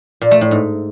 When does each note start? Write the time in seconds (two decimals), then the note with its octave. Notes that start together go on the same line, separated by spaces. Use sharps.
0.21 A#2
0.31 A3
0.41 A2
0.51 G#2